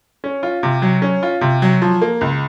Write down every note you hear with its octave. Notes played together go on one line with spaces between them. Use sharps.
C#4
F4
C3
F#3
C#4
F4
C3
F#3
F3
A#3
C#2